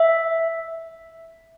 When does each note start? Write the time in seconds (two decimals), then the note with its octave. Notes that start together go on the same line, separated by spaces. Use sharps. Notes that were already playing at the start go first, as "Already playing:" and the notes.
Already playing: E5